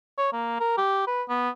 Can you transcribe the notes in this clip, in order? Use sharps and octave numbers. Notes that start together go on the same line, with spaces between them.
C#5
A#3
A#4
G4
B4
B3